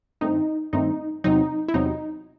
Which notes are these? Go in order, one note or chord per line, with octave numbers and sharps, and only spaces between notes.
G2 D#3 A3 C4 D#4
G2 D#3 A3 C4 D#4
E2 C3 F#3 C4 D#4
E4
E2 C3 F#3 C4 D#4